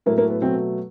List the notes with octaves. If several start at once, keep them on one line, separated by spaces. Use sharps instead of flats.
A2 F#3 A3 A#3
A#3
B3
B2 F#3 A3 C4